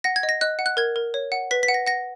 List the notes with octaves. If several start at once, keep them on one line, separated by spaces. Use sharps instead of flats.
F#5 A#6
G#6
D#5
A#6
D#5 F#6
F#5
F#6
A#4 G#6
A#4
C#5
F#5
B4 B6
B6
F#5
A#6
F#5 A#6